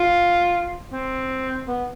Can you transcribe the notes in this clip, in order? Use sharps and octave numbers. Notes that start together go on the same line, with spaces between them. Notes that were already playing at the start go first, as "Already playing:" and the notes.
Already playing: F4
C4
B3